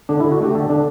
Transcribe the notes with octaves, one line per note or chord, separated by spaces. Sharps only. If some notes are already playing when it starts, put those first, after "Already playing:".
D3 D4
E4
D3
F#4
A3 G4
D3 A4
D3 D4